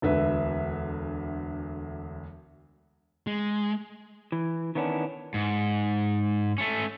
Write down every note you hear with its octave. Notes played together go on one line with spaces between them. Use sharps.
E1 D2 B4 E5
G#3
E3
D#3 E3 B3 C#4 D4
G#2
A3 C#4